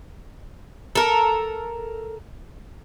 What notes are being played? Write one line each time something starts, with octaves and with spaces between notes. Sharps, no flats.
A4 A#4